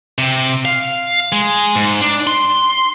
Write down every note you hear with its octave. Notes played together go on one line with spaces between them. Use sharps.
C3
F5
G#3
G#2
D4
C6